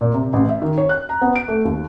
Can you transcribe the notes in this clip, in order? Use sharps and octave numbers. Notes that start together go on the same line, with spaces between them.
A#2
C3
A1
E5
D#3
C#5
F#6
A#5
B3
D7
A3
D#2